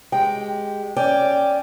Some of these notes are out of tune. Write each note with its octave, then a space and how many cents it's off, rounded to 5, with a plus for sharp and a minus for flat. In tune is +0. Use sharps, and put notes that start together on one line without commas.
G#3 +0 G4 +0 G5 +0
C#4 +0 D5 +0 G5 +5